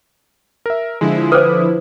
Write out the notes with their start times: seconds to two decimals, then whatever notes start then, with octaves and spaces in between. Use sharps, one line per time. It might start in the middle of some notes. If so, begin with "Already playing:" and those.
0.66 A#4 E5
1.01 D3 F3 G#3 E4
1.32 B4 C5 D6 D#6